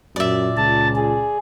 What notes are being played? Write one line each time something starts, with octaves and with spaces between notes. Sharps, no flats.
F#2 A#2 D5 E5
C#2 A5
G#4